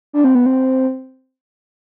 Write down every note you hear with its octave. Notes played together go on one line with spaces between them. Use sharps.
D4
C4
B3
C4